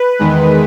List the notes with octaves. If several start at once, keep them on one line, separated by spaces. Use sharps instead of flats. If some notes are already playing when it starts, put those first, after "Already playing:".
Already playing: B4
E2 D#3 G#3